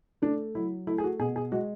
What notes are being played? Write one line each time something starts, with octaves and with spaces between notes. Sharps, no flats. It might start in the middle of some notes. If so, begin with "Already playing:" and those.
A3 D4
F#3 E4
A3 E4
G#4
F#4
B2 G#4
G#4
G#3 F#4